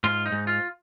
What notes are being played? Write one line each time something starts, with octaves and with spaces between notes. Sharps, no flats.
G#2 F4
D#4
G#2
F4